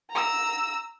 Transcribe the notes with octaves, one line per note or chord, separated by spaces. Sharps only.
A#5 E6